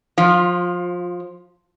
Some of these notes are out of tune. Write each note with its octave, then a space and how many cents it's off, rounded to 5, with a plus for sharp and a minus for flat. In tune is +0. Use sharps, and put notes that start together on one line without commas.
F3 +20 F4 +0